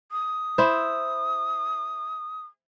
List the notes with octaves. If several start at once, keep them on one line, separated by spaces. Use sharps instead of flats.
D#6
E4 C5